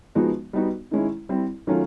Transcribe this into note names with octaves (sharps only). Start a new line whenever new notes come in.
F3 G#3 B3 D#4 F#4
G3 B3 D#4 F#4
D#3 G#3 C#4 E4
G3 C4 E4
D#3 F#3 A3 C#4 F4